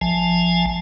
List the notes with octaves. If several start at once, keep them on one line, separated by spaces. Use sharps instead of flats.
A1 F3 G#5 A5